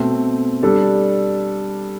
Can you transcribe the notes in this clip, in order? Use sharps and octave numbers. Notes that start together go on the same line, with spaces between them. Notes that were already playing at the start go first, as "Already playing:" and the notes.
Already playing: B2 A3 C4
G3 D4 A4